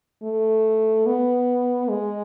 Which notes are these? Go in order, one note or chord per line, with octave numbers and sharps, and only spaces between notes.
A3
B3
G#3